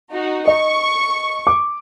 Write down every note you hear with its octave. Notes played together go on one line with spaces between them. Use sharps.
D#4 F#4
D#5 C#6
D6